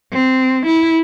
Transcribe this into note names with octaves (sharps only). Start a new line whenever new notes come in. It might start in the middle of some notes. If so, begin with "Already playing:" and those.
C4
E4